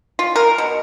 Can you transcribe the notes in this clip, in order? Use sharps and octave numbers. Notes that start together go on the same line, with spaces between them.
F4
A#4
B2